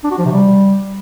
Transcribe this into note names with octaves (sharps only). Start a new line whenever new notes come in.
D4
F#4
F3
C3
G3